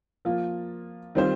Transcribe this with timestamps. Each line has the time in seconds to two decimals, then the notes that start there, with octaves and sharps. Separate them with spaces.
0.25 F3 A#3 F4
1.15 D#3 G3 C4 F4 C5